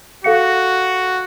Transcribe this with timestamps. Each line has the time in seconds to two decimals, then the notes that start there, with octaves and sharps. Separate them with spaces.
0.24 F#4 A4 F5 C#7